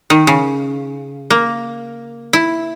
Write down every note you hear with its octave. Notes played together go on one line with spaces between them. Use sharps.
D#3
C#3
A#3
E4